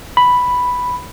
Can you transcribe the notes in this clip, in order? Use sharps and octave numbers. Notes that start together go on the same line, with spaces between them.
B5